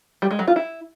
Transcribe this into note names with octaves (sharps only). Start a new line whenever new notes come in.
G3
G#3
F#3
F4
E4